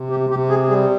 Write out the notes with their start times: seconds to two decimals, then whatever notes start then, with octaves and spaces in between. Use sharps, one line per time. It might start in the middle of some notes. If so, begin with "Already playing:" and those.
Already playing: C3
0.10 G4
0.29 C3 G4
0.49 G#4
0.68 G3 G#4